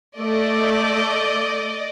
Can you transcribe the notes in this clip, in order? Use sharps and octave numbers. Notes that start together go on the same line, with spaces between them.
A3 D5 D#5